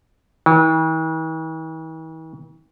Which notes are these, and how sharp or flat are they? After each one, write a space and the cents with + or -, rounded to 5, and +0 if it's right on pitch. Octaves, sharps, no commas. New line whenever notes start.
E3 -45